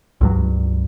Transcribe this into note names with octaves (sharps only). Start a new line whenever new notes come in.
C#2 G2 F#3